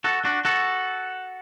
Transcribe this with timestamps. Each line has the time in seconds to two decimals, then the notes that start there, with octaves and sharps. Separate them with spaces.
0.04 F#4 A4
0.25 D4 F#4
0.45 F#4 A4